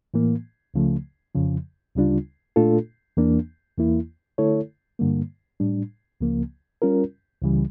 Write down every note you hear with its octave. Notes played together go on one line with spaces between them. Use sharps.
A2 E3 A#3
C#2 C#3 F3 A3
F2 C#3 F3
D2 C#3 G3 D4 F4
A#2 A3 D4 F4 A4
E2 E3 A#3 D4
E2 E3 A#3 E4
D3 A3 E4 A4 C#5
G2 D3 G3 A#3
A2 G3 D4
C#2 C#3 F3 A#3
G3 C#4 F4 A#4
C#2 C#3 E3 G3